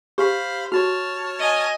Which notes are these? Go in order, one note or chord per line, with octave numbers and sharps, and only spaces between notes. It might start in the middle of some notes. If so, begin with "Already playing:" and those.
G4 C5 F5 B5
F#4 C#5 A5 F6
D#5 G#5